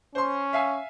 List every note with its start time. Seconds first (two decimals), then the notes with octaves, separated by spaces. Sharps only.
0.15 C#4 C5 C6
0.53 E5 F5 G#5